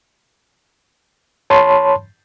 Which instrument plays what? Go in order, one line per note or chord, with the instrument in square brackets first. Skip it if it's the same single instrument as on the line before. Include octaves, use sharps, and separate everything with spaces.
[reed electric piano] C#5 A5 B5 C6